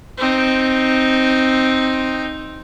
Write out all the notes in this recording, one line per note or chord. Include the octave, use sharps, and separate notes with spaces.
C4 D#4